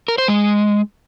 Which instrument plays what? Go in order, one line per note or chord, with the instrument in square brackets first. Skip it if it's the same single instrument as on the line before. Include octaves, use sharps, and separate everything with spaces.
[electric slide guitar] A#4
C5
G#3